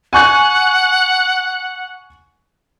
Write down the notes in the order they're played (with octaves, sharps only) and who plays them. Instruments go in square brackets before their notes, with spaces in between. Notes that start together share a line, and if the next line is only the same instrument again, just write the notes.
[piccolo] F#5 [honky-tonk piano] G#5 C#6 F#6